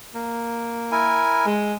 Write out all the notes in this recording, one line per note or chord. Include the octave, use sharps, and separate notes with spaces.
A#3
E4 A#4 G#5
G#3